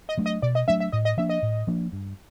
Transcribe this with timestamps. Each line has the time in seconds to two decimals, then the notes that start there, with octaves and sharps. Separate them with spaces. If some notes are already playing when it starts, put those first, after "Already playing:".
0.09 D#5
0.17 F#3 A3 D4
0.26 D#5
0.42 B2 D5
0.55 D#5
0.68 F#3 A3 D4 E5
0.80 E5
0.92 A2 D#5
1.05 D#5
1.17 F3 A#3 D4 E5
1.29 D#5
1.42 A2
1.67 F3 A#3 D4
1.92 G2